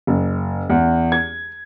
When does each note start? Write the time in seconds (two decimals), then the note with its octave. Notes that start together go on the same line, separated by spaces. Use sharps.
0.07 F#1
0.70 E2
1.12 G#6